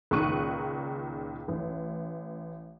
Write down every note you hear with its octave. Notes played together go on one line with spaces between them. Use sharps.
C#2 A#2 D#3 C#6 F#6 D#7
A1